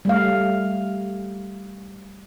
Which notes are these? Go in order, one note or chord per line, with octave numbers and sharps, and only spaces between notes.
G3 A3 F5